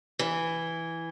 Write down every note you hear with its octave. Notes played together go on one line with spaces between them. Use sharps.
E3